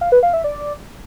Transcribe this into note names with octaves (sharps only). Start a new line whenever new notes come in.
F5
B4
F5
E5
D5